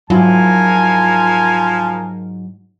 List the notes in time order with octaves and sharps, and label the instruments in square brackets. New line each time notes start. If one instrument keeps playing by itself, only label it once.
[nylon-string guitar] G#2 E4 F4 [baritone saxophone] F3 [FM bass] F#3 [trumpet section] A#4 G#5